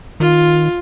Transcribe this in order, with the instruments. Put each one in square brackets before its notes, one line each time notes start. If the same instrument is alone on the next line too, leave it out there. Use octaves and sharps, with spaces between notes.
[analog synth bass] D#3 [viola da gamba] F4